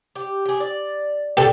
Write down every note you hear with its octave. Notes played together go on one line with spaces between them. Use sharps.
G4
G4 G#4
D5
D4 G4 A4